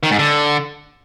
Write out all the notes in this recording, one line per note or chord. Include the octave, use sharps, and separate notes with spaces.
D#3
G#2
D3